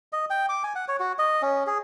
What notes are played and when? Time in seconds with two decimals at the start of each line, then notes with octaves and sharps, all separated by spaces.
0.13 D#5
0.30 G5
0.49 D6
0.64 G#5
0.75 F#5
0.88 C#5
1.00 F#4
1.19 D#5
1.42 C#4
1.67 G#4